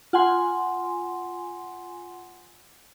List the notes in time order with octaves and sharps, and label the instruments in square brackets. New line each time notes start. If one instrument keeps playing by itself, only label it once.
[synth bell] F4 F#5 G#5 C6